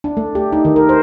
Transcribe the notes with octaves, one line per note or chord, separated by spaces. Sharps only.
D4
A3
G4
D#4
D#3
A#4
C5